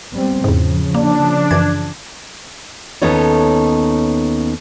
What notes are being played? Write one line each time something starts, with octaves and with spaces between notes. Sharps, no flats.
G3 B3 C4
E2 G#2 C#3 F3
A#3 D4
F#2 E3 G#6
D#2 B3 C#4 D#4 A4 C#5